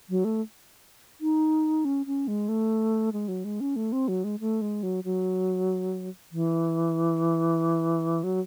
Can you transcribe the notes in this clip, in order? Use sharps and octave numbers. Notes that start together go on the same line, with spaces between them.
F#3
A3
D#4
C#4
C#4
G#3
A3
G#3
F#3
G#3
C#4
A3
C4
F#3
G#3
A3
G#3
F#3
F#3
E3
F#3